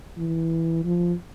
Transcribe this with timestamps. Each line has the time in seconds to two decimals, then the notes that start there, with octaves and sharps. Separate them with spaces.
0.17 E3
0.84 F3